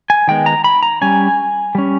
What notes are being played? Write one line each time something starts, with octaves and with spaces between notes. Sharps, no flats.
G#5
D#3 G#3 B3 G5
A#5
B5
A#5
G3 C#4 G#5
G3 C#4